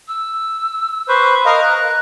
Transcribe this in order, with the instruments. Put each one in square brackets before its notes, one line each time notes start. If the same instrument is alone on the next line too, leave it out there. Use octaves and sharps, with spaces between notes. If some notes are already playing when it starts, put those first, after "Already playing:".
[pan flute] E6
[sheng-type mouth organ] B4 C5 [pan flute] C#6
[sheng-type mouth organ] A#4 D#5 F5 [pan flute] A#5
[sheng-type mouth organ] A#4 [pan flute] F#6